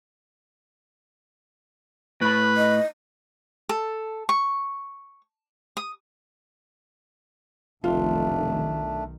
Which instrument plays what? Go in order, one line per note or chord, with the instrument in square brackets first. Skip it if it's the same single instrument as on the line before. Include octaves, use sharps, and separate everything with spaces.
[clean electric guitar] A2 B5 [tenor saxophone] B4
[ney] D#5
[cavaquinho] A4
C#6
D#6
[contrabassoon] F1 [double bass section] B1 D#3 [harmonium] A3 D4 [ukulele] F4